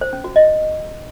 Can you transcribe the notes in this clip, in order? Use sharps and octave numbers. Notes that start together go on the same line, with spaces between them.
C5
C#4
F#4
D#5